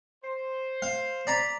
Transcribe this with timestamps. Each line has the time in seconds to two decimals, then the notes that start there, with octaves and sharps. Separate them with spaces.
0.24 C5
0.82 F5
1.27 D5 A#5 B5